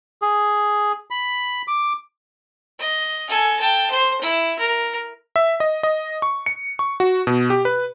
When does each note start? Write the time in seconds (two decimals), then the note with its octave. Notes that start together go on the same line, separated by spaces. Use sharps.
0.22 G#4
1.11 B5
1.68 D6
2.79 D#5
3.29 A4 G#5
3.59 G5 A5
3.91 C5
4.21 E4
4.59 A#4
5.36 E5
5.60 D#5
5.83 D#5
6.22 C#6
6.46 C#7
6.79 C#6
7.00 F#4
7.27 B2
7.50 G4
7.65 B4